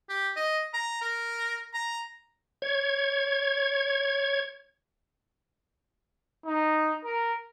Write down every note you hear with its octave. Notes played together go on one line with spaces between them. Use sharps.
G4
D#5
A#5
A#4
A#5
C#5 G#6
D#4
A#4